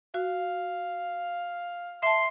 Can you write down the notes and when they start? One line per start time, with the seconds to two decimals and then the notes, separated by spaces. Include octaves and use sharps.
0.14 F#4 F5
2.03 E5 A5 C6